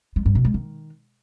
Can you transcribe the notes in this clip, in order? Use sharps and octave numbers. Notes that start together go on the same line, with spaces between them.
G#3
G2
B2
G#3
D#3